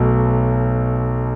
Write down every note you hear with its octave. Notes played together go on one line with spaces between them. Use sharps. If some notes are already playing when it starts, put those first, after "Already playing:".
Already playing: B1 B2 A3